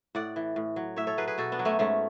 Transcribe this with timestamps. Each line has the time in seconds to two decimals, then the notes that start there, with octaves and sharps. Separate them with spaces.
0.15 A2 D5 F#5
0.36 E3
0.56 A2
0.76 F#3
0.96 A2 C#5 E5
1.07 A4 C#5
1.17 F#3 G#4 B4
1.27 G#4 B4
1.38 B2 F#4 A4
1.52 B3 D4
1.59 F#3
1.65 A3 C#4
1.79 G#2 A3 C#4